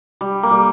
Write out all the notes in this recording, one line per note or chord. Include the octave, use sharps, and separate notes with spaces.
G3
A#3
G3